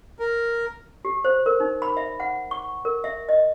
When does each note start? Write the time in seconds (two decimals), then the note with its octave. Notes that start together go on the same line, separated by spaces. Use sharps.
0.19 A#4
1.05 G4
1.24 C5
1.46 A#4
1.60 D#4
1.82 B5
1.97 E5
2.20 F#5
2.51 C#6
2.85 A#4
3.04 E5
3.29 D#5